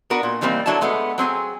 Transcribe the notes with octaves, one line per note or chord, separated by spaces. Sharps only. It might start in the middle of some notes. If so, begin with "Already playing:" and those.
B3 D4 F#4 A#4 B4
A#2
D#3 E3 G3 A#3 C4
D3 F#3 D4 E4 A5
G#3 A3 B3
F#3 C4 G#4 G#5